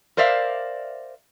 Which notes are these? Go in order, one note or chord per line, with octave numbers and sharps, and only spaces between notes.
A#4 C5 D5 E5 F5